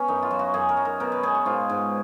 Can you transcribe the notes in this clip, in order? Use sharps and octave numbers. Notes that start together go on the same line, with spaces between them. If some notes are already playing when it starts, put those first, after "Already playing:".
Already playing: B3 C#4
F#2 D#4
F4
F#3
F#4
F#2 G#4
A#4
F#3
A#4
B2 A#4
B4
B2 G#4
F#4
G#2 F4
G#2